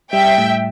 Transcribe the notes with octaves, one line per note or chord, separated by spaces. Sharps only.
G3 E5 G5
A2